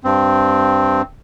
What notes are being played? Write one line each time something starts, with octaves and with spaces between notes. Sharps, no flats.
G2 C4